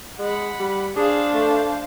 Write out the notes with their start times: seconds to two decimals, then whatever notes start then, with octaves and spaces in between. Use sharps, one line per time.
0.19 G#3 F#5 B5
0.60 G3
0.97 D4 G#4 C5 F5
1.34 A3